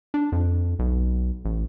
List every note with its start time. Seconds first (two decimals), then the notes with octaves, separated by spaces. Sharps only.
0.14 D4
0.32 F2
0.79 B1
1.45 A1